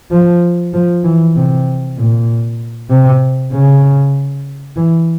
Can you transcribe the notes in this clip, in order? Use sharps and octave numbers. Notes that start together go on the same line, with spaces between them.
F3
F3
E3
C3
A#2
C3
C#3
E3